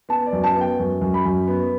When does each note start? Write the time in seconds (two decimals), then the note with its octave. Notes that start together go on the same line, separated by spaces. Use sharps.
0.09 B3 A5
0.27 D5
0.33 F#2
0.44 A5
0.55 B3
0.61 G5
0.79 F#2
1.01 F#2
1.14 B5
1.25 F#2
1.48 B3